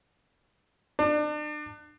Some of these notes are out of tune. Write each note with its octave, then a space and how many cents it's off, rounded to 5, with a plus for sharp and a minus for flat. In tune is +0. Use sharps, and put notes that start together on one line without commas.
D4 +35